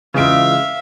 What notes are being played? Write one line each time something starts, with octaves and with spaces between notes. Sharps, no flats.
C#3 E3 G#3 F4 E5 F5 D7